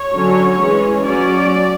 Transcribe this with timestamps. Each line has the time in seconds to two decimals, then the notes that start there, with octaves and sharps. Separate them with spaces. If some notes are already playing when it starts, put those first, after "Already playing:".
Already playing: C#5
0.14 D3 F#3 C#4
0.60 E3 G#3 C#4
1.05 F#3 C#4 D5